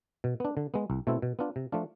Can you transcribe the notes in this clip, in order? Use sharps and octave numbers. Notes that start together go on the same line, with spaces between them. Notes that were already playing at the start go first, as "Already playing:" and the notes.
B2
B3 D4
D3
G#3 B3
C2
B2 A3 C4 E4
B2
B3 D4 F4
C3
F3 A3 D4 F4